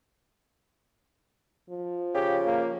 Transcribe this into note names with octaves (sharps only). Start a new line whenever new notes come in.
F3
C#3 G4
A#3